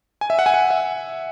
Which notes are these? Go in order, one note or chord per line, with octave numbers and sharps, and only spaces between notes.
G#5
E5
F#5
G#5
F#5
E5